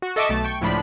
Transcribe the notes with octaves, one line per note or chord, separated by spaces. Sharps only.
F#4
A4 D#5 E5 C#6 D6 E6
B1 A3 A5
G5 C#6
C#2 A2 F3 D4 B5